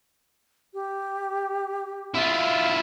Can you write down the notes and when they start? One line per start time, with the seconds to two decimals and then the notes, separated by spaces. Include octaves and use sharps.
0.74 G4
2.14 E4 F4